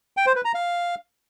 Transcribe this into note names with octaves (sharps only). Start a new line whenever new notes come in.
G5
C5
B4
A#5
F5